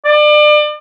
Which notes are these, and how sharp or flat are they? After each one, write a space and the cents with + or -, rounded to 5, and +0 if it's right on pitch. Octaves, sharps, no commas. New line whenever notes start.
D5 +30